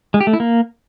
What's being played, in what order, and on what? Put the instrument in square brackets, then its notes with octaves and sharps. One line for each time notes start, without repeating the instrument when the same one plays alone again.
[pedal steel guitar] G#3
G4
A3
E4
A#3